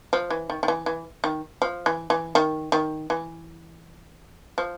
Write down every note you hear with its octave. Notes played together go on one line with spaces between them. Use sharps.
F3
E3
D#3
D#3
E3
E3
D#3
F3
E3
E3
D#3
D#3
E3
F3